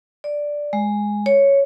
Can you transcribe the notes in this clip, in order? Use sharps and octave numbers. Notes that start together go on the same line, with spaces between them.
D5
G#3
C#5